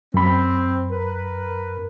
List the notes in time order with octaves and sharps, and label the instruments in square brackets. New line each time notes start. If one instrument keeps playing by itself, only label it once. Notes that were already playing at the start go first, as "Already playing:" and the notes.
[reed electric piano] F#2 B5 [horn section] C4
[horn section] A#4 B4